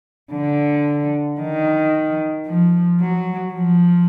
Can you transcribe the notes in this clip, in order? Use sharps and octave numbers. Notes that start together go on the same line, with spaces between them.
D3
D#3
F3
F#3
F3